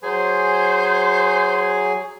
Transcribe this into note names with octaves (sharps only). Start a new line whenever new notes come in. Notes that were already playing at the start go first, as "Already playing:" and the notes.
F#3 G#4 C5 G#5